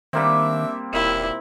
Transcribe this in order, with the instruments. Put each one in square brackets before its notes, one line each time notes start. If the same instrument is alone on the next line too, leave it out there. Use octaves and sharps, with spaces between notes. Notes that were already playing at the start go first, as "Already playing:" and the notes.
[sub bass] D#3 [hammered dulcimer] G3 A#3 C4 [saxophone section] D4 E5
[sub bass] E1 [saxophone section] D#2 A#2 E5 [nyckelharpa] E4